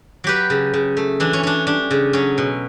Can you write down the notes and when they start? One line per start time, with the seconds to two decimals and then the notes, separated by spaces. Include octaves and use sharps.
0.24 F#3 G4 B4
0.50 C#3
0.73 C#3
0.97 A3
1.20 E3 D4
1.33 C#4
1.43 C#4 D4
1.67 G3 D4
1.91 C#3
2.13 F#3 C#4
2.38 B2